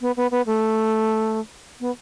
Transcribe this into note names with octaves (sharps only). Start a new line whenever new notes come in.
B3
B3
B3
A3
B3